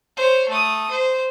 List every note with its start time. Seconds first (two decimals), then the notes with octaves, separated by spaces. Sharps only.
0.16 C5 C#5
0.49 A3 D#6
0.90 C5